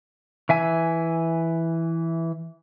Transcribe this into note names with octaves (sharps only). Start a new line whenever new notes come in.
E3 E5 G#5